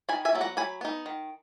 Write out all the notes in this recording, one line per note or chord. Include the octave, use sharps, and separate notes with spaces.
D#3 G#5 B5
E5 G#5
F#3 B3 E4
F#5 A#5
F#3 G#5 B5
B3 D#4
D#3